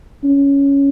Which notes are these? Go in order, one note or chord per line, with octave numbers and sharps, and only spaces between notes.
C#4